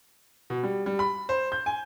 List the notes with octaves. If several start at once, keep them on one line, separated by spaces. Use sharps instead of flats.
B2
G3
G3
B5
C5
G6
G#5